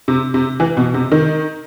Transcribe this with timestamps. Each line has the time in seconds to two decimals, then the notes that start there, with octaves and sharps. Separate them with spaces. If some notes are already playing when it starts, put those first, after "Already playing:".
0.08 C3
0.34 C3
0.60 E3
0.77 B2
0.94 C3
1.12 D#3